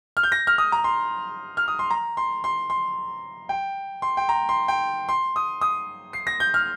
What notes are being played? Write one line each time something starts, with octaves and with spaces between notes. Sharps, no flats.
F6
G6
A#6
F6
D#6
A#5
C6
F6
D#6
C6
A#5
C6
C6
C6
G5
C6
G5
A#5
C6
G5
C6
D#6
D#6
C7
A#6
G6
F6